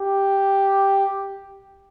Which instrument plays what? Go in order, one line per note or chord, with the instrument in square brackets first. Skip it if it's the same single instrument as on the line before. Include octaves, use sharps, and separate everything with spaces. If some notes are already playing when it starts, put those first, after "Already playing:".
Already playing: [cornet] G4